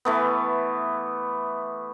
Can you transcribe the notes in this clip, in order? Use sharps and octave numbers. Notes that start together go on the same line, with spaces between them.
E3 A3 B3